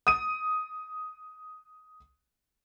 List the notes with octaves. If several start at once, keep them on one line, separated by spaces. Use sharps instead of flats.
D#6 D#7